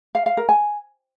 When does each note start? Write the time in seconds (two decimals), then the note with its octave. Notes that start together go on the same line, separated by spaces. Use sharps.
0.15 F5
0.26 F5
0.37 A#4
0.49 G#5